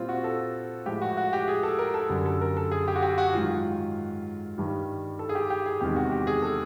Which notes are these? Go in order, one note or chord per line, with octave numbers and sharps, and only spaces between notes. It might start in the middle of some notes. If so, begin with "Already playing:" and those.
Already playing: A#2 G3 C4 F4
F#4
A4
A2 F3 G#3 G4
F#4
F#4
G4
G#4
A4
A#4
A4
F#2 D3 G3
A4
A#4
A4
G#4
G4
F#4
G4
F#4
G#2 D#3 F#3 F4
G2 D#3 G3
A4
G#4
G4
G4
G#4
E2 C3 D#3 G#3 G4
F#4
G4
G#4
A4